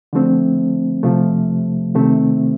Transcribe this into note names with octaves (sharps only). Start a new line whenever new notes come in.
D3 F3 A3 C4
C3 F3 A3
C3 D#3 A3 C4